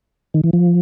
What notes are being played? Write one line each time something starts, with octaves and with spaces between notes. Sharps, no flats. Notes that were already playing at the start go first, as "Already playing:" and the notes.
D#3
E3
F3